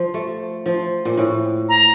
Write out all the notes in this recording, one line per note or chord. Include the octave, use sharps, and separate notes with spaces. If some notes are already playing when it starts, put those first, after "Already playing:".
Already playing: F3
A3
F3
A#2
A2
A#5